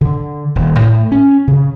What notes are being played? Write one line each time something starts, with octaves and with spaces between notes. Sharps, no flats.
D3
D#1
A2
C#4
C#3